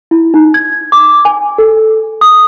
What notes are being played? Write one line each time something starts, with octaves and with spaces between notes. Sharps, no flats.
E4
D#4
G#6
D6
G#5
A4
D#6